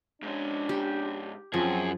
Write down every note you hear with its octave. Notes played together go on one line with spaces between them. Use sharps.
G#2 C#4 D4
G4
F#2 F3 C4 G#4